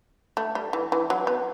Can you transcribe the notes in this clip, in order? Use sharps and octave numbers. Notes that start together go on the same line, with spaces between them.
A3
G3
E3
E3
F#3
B3